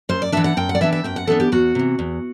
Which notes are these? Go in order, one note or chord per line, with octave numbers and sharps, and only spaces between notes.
F#2 C5
D5
E3 B3 D4 E5
F#5
F#2 G5
F#5
D5
E3 B3 D4 E5
E5
F#2 G5
F#5
E3 B3 D4 A4
G4
E2 F#4
C3 E3
E2